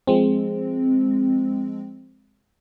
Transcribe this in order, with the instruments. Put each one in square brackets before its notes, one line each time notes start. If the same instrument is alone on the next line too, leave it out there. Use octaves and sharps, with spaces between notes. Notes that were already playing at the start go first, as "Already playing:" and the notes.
[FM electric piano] F3 G#3 C4